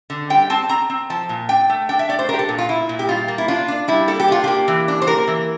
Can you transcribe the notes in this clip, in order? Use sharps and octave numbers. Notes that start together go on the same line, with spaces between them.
D3
G3 G5
C4 A5
C4 A#5
C4
F3 A5
A#2
D4 G5
A3
D4 G5
E5
A3 D5
C5
D4 G4 A#4
A4
A#2
F4
A#3 E4
A#2
G4
G3 F4
A#3
E4
D4 F4
D4
G3 E4
A#3 A4
G4
D4 F4
A#3 G4
E3
D4
C5
A#3 A#4
E3